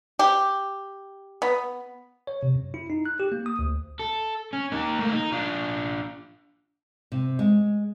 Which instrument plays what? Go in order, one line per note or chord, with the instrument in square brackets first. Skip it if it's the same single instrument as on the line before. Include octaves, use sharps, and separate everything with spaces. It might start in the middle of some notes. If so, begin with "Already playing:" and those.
[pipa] G4
B3
[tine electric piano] C#5
C3
F#2
E4
D#4
F#6
G4
A#3
D#6
D2
[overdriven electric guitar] A4
C#4
A#3 D#4
A3 A#3
D#4
D4 F4
[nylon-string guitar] C3
G#3